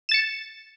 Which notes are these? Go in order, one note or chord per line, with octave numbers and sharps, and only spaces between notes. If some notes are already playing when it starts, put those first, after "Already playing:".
A6 C#7 E7